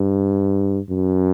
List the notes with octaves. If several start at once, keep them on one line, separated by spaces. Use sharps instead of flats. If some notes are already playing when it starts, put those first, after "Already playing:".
Already playing: G2
F#2